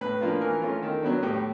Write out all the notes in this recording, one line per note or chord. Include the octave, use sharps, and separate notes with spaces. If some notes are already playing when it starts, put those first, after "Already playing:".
A2 B4
F3 A#3 D4 F4
E3 A#4
A3 C#4 F4
D#3 A4
F#3 B3 D4
A2 G4